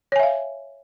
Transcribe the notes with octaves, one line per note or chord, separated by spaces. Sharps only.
C#5 E5 F5 G#5